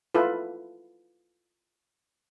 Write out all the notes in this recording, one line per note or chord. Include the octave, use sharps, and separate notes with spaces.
E4 F4 A4 B4